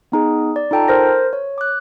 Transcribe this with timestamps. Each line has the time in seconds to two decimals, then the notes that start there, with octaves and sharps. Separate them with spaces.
0.12 B3 D#4 G#4
0.56 D5
0.71 D#4 F4 A4 G5 A5 A#5
0.88 A#4 C5 A#6
1.33 C#5
1.58 D6 F#6